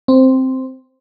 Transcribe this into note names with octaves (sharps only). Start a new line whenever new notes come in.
C4